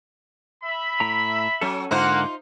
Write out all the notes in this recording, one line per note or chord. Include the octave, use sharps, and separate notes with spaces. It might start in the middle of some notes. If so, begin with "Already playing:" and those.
E5 B5
A2 A#5
F#3 C#4 A4
G#2 D3 A#3 D#4 F4 C5 F#5